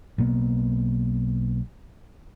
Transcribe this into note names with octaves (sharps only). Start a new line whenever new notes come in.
B1 B2 A#3 B3